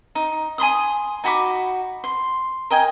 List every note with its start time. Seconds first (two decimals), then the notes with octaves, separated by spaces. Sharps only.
0.15 D#4
0.58 G#5 B5 C6 D#6
1.24 D#4 F#4 B5 D6
2.04 C6
2.71 A#4 D#5 G5 G#5